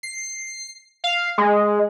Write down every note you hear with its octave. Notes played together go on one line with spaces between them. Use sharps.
C7
F5
G#3